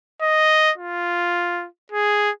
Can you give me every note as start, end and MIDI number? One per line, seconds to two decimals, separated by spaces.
0.22 0.72 75
0.78 1.68 65
1.92 2.30 68